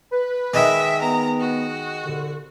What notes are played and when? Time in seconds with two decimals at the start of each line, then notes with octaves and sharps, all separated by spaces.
0.12 B4
0.54 D#3 G#3 E5
1.02 B3 A#5
1.40 F#4
2.03 C2 D3